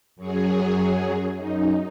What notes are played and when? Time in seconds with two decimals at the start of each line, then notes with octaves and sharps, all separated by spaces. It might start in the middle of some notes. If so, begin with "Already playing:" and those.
0.16 F#2 F#3 G#4
1.36 F#2 D#4